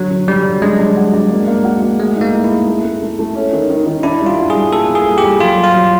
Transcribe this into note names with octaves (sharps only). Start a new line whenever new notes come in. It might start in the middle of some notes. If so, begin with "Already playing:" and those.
Already playing: D3 F#3
D3
D3 G3
F#3
G#3 D4
D4
F#4
D4
A#3
A#3
F#4
A#3
A3 G#4
D#4
A#3
D#4
E4
G#4
A3
A3
A3
A3
C#4
D#3
D#3
D#3
D4 E4
G3
F4
F#4
G#4
G3
A#3 A4
A#3
G#4
G3
G4
G3
F#3 F4
F#3
F4
F#3